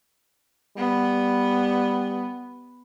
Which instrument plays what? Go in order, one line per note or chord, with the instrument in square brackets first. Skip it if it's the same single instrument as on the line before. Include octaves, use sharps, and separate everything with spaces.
[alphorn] G3 [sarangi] B3